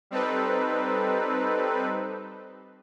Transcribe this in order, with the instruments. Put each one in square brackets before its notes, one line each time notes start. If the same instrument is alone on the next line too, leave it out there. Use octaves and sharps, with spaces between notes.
[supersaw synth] G3 C4 D#4 A4 B4